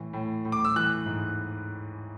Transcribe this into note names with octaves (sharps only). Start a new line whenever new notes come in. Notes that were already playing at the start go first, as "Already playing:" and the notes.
Already playing: A2 E3
A2
A2
D6
E6
E3 F#6
G#2